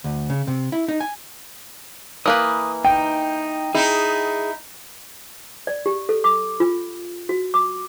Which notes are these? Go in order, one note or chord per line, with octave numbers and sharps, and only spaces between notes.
D2
C#3
C3
E4
D#4
G#5
E3 A#3 B4 D#6
D#4 G5
D#4 E4 G#4
D5
G4
A4
D6
F4
F#4
D6